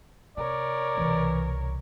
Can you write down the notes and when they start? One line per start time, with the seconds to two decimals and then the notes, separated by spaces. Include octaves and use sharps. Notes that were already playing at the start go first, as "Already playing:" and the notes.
0.37 C3 A#4 C#5 D5
0.97 C2 B2 E3